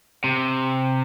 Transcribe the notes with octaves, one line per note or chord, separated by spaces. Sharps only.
C3